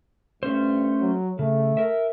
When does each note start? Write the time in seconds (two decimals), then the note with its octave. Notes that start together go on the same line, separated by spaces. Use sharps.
0.43 G2 A3 C#4 C5
1.00 F#3
1.39 C#3 A3
1.77 A#4 E5